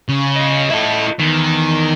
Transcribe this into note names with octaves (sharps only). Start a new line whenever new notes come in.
C#3
F4 D#5
E4 A4
E2 D#3